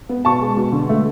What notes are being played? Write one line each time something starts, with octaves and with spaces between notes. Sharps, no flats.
B3
B2 A5 C#6
G#3
B2
D3
A3